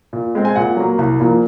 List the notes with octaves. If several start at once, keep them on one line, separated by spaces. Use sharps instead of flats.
A#2
G#3 C4
G#5
A#2 F#5
F#3 A#3
C2
A#2 F3 A#3